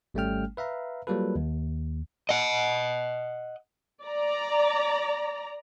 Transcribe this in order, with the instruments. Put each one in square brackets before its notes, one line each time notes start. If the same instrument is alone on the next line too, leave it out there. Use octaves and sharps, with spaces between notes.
[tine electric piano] G#1 G3 A3 C#4 G5 F6
B4 E5 F5 A#5
F#3 G3 A#3 F4 A4 B4
D#2
[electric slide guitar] D#5 F#5
[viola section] D5 A#5